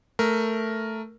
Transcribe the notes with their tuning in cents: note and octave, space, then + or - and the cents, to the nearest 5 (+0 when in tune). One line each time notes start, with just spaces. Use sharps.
A3 +5 A#4 +0